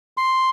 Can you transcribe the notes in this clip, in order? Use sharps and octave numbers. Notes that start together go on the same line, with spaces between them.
C6